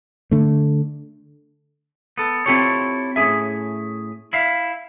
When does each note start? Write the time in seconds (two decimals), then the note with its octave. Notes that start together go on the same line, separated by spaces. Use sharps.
0.31 D3 A3
2.18 B3 A4
2.46 C4 E4 F4 G4 A4 C#5
3.16 A2 C#4 E4 G#4 E5
4.33 E4 E5 F5